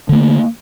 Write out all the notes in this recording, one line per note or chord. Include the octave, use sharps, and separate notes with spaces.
D3 A3 A#3